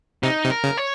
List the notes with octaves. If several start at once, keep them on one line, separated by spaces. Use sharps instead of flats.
C3 D#4
C3
A#4
C#3
C#5